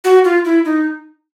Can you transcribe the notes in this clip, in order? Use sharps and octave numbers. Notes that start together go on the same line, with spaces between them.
F#4
F4
E4
D#4